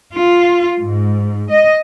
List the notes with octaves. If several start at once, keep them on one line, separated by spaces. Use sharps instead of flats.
F4
G#2
D#5